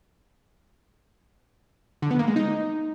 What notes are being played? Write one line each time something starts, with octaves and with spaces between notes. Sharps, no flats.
D3
B3
A#3
G#3
D#4